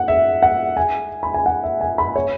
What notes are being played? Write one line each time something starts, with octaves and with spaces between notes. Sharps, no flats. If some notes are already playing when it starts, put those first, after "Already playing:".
Already playing: F#5
E5
F#5
G#5
B5
G#5
F#5
E5
G#5
B5
C#5